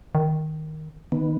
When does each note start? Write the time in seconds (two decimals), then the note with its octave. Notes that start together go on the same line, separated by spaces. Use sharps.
0.15 D#3
1.12 D#3 B3